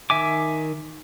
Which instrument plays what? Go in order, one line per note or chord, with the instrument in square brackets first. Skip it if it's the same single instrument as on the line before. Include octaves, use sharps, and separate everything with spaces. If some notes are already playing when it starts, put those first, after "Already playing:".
[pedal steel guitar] D#3 E5 G#5 D6